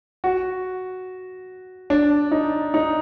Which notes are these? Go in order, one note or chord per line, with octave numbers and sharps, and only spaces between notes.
F#4
D4
D#4
D#4